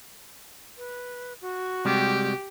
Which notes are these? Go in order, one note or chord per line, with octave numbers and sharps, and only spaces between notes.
B4
F#4
C3 G3 G#3 G4